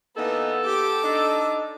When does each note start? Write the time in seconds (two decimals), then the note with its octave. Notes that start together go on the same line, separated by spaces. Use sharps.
0.17 E3 A#3 B3 D#4 A4
0.66 G4 D6
1.03 D4 D#4